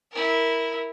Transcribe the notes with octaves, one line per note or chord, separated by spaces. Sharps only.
E4 A#4